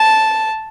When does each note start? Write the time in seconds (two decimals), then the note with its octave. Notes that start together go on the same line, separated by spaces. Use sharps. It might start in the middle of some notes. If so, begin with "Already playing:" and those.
Already playing: A5